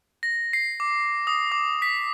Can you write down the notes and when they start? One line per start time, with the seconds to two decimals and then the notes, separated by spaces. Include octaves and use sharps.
0.23 A#6
0.53 C7
0.80 D6
1.27 D#6
1.52 D6
1.82 B6